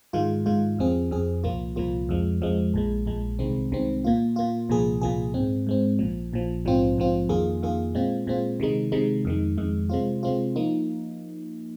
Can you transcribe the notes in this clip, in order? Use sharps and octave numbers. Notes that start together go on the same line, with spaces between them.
G#2 D#3 G#3 F4
G#2 D#3 G#3 F4
F2 F3 C4 G#4
F2 F3 C4 G#4
C2 A#2 F3 A#3 F4
C2 A#2 F3 A#3 F4
F2 F3 G#3
F2 F3 G#3
A#1 A#2 G#3
A#1 A#2 G#3
C2 C3 D#3 G#3 C4
C2 C3 D#3 G#3 C4
A#2 A#3 F4
A#2 A#3 F4
C2 A#2 F3 A#3 G#4
C2 A#2 F3 A#3 G#4
G#2 G#3 C4
G#2 G#3 C4
A#1 A#2 F3
A#1 A#2 F3
A#1 G#2 F3 C4 F4
A#1 G#2 F3 C4 F4
F2 D#3 A#3 F4 G#4
F2 D#3 A#3 F4 G#4
A#2 G#3 C4 F4
A#2 G#3 C4 F4
C3 D#3 G#3 D#4
C3 D#3 G#3 D#4
F2 D#3 G#3
F2 D#3 G#3
C3 G#3 C4 F4
C3 G#3 C4 F4
F3 A#3 D#4